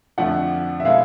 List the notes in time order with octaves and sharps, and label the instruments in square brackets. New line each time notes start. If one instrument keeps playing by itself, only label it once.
[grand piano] F2 D3 F3 A3 D4 [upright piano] F#5
[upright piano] E5
[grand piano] B2 G#3 C4 E4 A4 [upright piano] F5